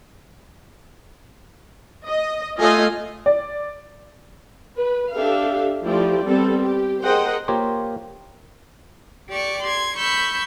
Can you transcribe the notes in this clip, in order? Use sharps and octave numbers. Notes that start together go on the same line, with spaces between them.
D#5
A3 F4 D#5 G#5
D5
B4
D4 G4 A4 E5 F5
F3 A3 E4 G4 D5
G3 B3 C4 A4
G4
G#4 A#4 C5 D#5 F#5 G5
A#3 F4 G4 A#4 C5 C#5
G4 D5 C#6 D6
C6 G#6
B5 C#6 E6 G6